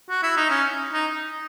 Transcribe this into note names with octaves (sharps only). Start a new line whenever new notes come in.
F#4
E4
D#4
C#4
D#4